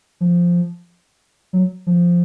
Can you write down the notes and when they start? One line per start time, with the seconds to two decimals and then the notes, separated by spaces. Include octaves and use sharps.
0.21 F3
1.53 F#3
1.87 F3